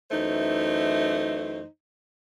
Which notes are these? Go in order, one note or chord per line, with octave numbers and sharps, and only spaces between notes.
F#2 E3 A3 D#4 C5